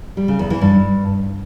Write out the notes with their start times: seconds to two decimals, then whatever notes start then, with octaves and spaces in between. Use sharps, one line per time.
0.17 G3
0.28 C#3
0.39 E2
0.50 E3
0.61 G2